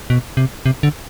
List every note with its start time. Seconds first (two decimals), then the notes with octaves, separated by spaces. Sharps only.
0.10 B2
0.37 C3
0.66 C3
0.83 D3